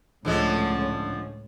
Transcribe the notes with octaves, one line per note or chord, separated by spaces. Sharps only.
C#2 A2 D3 F3 G#3 C#4